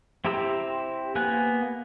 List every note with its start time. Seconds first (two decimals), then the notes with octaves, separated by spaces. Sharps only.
0.25 C4 E4 G4 A#5 E6
1.15 A#3 B3 G#5 F#6